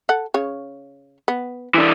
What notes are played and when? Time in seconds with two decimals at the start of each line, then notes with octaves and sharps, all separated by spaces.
0.09 A4 F#5
0.34 C#3 C#5
1.28 B3
1.74 E3 D4